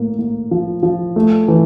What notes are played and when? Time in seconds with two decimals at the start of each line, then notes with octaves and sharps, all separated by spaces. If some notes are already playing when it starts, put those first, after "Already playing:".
Already playing: A2 A#3
0.19 A#3
0.51 F3
0.83 F3
1.16 A3
1.48 E3